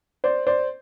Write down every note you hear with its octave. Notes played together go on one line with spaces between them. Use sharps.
C5 D5
C5 D5